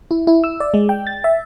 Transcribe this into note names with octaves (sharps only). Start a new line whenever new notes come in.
E4
E4
E6
D5
G#3
G5
A6
E5